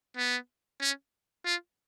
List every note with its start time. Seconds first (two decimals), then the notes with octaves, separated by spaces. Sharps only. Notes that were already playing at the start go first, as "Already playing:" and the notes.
0.17 B3
0.81 C#4
1.45 F4